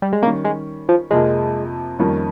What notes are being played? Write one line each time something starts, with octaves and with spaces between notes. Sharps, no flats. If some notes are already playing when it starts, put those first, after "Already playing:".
G3
G#3
D#3 G3 A#3 C#4
G#3
F3
F2 C3 F3 G#3 A#3
F2 D#3 G3 A#3 C#4